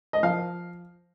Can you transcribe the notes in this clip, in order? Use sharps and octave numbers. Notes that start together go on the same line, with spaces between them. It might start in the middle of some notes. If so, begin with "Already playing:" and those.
D#5
F3 F5